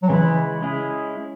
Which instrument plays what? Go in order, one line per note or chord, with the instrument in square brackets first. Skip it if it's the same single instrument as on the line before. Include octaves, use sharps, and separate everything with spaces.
[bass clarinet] F#3
[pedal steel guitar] C#3 G#3 E4 B4 [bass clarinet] E3
[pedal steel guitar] G#3 C#4 E4 G#4